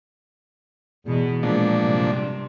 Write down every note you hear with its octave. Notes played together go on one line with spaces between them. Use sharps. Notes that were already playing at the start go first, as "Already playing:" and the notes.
E2 B2 B3
A#2 F3 G#3 B3 D4
G2 C3 C4